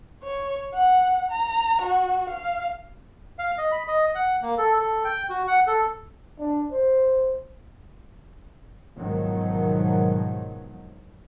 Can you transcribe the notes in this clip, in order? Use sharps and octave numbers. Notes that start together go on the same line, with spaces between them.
C#5
F#5
A#5
F#4
F5
F5
D#5
B5
D#5
F#5
A#3
A4
A4
G5
F#4
F#5
A4
D4
C5
G#2 B2 D#3 F3 F#3